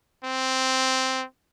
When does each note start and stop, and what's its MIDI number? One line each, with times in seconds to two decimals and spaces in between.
0.24 1.24 60